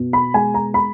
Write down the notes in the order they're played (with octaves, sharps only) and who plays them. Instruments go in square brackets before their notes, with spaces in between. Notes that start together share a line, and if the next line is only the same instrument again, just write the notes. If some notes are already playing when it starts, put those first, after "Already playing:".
Already playing: [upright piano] B2
B5
G#3 G#5
A#5
B5